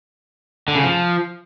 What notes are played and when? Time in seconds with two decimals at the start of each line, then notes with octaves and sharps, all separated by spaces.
0.68 D3
0.76 C#3
0.83 F3